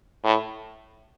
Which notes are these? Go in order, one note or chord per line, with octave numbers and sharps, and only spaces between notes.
A2